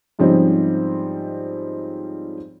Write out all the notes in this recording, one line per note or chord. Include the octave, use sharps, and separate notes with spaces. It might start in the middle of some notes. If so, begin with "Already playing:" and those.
G#2 F3 G3 C4 C#4 D#4